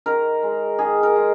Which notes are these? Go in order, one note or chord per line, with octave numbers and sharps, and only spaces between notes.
D#3 A#4
G#3
D#3 G#4
A#4
G#3